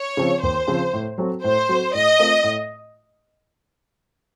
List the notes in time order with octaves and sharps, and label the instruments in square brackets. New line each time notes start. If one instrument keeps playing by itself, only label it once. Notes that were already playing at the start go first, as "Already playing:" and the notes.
Already playing: [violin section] C#5
[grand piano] C#3 F3 C4
[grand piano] D#2 [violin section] C5
[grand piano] C#3 F3 C4
A2
F#3 C4 F#4 A4
[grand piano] A2 [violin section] C5
[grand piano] F#3 C4 F#4 A4
[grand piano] A2 [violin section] D#5
[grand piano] A3 C4 F4 A#4
A2